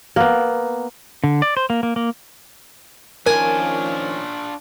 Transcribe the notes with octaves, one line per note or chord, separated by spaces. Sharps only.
A#3 B3
D3
D5
C5
A#3
A#3
A#3
D#3 F3 C#4 D4 F4 A#4 G#5